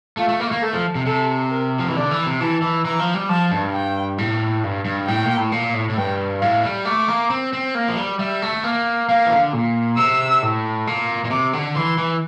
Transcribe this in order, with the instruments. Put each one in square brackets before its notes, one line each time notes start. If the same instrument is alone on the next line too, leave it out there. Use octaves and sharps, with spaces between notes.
[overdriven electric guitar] A3 [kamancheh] F4
[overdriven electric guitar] A3
A#3
A3
A#3
[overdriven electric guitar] A3 [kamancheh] A4
[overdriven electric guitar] F3
C3
[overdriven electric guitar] C3 [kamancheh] A4
[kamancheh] A#4
[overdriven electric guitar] F3
E3
[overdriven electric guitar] D3 [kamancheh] D5
[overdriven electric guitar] E3
C3
[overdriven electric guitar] E3 [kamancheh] A5
[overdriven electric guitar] E3
[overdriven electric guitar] E3 [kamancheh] A#5
[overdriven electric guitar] F3
G3
[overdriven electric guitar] F3 [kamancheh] A5
[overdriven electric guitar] G2
[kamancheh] G5
[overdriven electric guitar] A2
G2
G2
[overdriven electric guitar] A2 [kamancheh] G5
[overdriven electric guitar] A#2
A2
A#2
A2
A2
[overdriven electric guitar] G2 [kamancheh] G5
[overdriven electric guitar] A2 [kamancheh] F5
[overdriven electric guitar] G3
[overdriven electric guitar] A3 [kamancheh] D6
[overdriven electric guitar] A#3
C4
C4
A#3
F3
G3
[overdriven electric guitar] G3 [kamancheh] E5
[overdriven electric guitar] A3
A#3
[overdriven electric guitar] A#3 [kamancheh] F5
[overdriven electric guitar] E3
D3
A#2
[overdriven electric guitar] C3 [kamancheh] E6
[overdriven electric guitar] A2
A#2
A#2
[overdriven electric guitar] C3 [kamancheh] D6
[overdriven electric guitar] D3
[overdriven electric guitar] E3 [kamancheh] C6
[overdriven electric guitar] E3